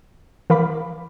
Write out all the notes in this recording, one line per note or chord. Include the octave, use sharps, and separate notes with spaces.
E3 A#4 F5 B5 D6 B6